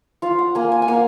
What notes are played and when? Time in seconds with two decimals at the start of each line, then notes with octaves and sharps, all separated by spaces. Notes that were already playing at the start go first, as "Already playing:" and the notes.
0.22 F4 F5
0.39 F#5
0.55 A#3 G#5
0.72 G#5
0.82 G#5
0.88 A#3 F#5